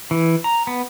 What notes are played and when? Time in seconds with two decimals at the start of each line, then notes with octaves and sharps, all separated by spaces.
0.11 E3
0.44 A#5
0.67 B3